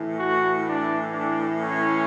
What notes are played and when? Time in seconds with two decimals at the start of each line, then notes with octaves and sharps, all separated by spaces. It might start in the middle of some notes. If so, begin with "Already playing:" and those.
Already playing: A2 E3
0.17 F#4
0.64 D4
1.11 D4
1.58 C#4